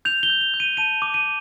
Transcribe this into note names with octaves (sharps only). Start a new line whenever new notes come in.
G6 F7
G7
G6
F7
G6
D#7
A5 D#7
D6
D#7